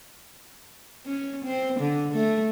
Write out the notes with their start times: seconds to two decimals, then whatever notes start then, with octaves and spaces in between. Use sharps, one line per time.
1.06 C#4
1.44 C4
1.80 D3
2.13 A3